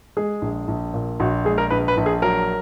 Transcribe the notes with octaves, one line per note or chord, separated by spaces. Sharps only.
G#3 G#4
A#1
A#1
A#2
A#1 F#4
G#3 G#4
A#4
A#1 B4
B4
A#1
G#4
F#3 A#4